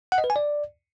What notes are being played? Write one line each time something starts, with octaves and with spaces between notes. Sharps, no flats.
F#5
D#5
B4
G#5
D5